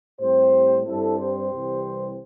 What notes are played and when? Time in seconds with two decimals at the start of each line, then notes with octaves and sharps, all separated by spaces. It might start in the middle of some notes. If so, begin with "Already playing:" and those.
0.19 A2 G3 C4 G4 C5
0.86 G2 G3 C4 E4 A4
1.19 G4 C5
1.52 C2 C3 E3 G3 C4